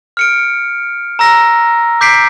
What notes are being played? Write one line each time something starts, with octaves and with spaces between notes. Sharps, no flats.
F6 C#7 D7
A#5 E6 A#6
D6 G6 B6 C7 D7